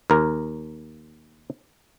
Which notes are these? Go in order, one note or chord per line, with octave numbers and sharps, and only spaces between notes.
D#2 A#4